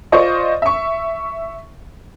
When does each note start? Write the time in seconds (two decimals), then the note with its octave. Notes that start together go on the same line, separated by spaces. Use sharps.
0.12 F4 C5 D5 D#5 C#6
0.62 E5 C#6